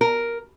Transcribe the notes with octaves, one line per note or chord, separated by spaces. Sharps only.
A#4